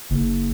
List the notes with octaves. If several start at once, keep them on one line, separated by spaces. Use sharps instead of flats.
F#1